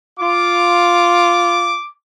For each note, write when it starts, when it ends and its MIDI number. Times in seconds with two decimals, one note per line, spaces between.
0.20 1.78 65
0.20 1.91 86